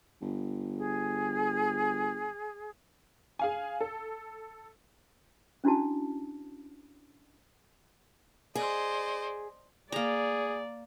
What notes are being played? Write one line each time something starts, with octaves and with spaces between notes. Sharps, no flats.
G1
G#4
G#4 F5 G#5
A4
C#4 D4 E4 F#4 A5
G#4 C5 D5 D#5
A#3 G#4 D5 A#5